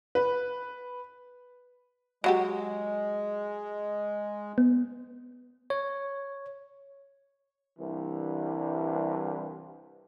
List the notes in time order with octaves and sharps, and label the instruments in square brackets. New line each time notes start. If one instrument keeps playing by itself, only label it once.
[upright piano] B4
[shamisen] F#3 F#4 G4 [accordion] G#3
[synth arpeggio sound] B3
[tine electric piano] C#5
[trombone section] C2 G2 E3